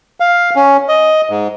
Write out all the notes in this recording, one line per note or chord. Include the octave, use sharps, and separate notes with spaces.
F5
C#4
D#5
G#2